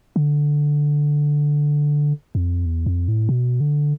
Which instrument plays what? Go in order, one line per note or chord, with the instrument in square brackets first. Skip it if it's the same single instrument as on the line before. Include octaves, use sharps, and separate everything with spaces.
[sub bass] D3
F2
E2
F2
A2
B2
D3